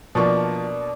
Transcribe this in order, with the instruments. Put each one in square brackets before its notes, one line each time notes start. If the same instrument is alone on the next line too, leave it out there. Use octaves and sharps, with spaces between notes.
[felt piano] B2 A#3 [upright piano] F3 C#6 [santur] D4 D5